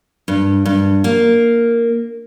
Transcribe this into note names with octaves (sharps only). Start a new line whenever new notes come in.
G2
G2
A#3